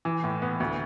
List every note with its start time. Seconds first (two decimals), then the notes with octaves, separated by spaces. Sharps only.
0.05 E3
0.24 A2
0.42 B3
0.60 D2